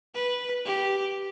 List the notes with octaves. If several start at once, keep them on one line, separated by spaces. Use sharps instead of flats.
B4
G4